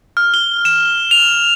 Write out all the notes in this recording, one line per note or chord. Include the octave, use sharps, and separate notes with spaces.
F6
G7
E7
F7